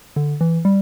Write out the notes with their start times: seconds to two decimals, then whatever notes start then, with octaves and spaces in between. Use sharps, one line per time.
0.16 D3
0.41 E3
0.65 G3